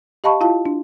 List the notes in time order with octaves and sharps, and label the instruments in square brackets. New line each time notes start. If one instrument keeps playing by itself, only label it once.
[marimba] G4 D#5 F5 A5 B5 C#6
E4 F4 F5 A5
D4